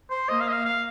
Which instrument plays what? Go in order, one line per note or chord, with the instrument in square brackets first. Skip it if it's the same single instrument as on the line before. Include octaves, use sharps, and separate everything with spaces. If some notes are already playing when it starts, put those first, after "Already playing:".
[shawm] C5
[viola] A#3 [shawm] D#5
[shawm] F5
D#5
F5
F5